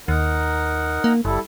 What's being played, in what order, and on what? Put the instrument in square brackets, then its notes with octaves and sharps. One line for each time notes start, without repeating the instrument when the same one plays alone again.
[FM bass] D#2 [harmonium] D#4 A#4 F#5
[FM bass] A#3
[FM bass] F#1 [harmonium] G3 E4 A4